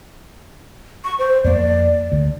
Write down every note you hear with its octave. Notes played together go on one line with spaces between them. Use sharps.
C#6
C5
F2 A#3 D5
D2